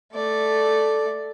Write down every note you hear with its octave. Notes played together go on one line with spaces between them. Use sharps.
A3 D5